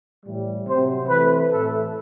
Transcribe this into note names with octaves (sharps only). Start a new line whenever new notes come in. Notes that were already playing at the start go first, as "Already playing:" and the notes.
A2 E3 G3
C3 F#3 C4 C5
E3 A3 C4 B4
A2 E3 A3 A4